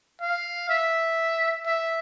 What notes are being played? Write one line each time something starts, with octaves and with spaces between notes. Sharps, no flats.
F5
E5
E5